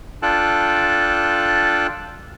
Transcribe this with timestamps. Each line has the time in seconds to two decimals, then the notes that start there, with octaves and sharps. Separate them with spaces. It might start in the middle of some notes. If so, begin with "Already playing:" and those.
0.23 D4 F4 A4 G5 A5 F#6